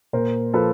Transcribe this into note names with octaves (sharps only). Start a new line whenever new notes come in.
A#2 A#4 C5
F3 A4 B4